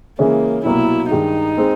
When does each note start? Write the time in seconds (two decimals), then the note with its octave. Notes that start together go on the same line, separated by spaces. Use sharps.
0.19 C#3 E3 G#3 A#3 C#4
0.65 C2 B2 F#3 A#3 E4
1.11 G2 D#3 G#3 D#4
1.58 G#3 C4